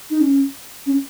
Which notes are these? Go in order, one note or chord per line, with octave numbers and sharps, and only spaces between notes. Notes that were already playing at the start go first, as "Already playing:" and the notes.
D#4
C#4
C#4